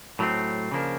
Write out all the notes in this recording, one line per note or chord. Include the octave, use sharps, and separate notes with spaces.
A2 F#3 A3 C4
C#3 F3 A#3 D4